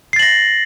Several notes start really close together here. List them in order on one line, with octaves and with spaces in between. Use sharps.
C7 A6 F#7 A#6